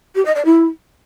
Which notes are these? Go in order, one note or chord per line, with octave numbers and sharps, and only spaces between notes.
G4
D#5
D5
E4